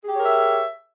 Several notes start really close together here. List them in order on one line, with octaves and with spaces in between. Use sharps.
G#4 G4 C#5 A#4 E5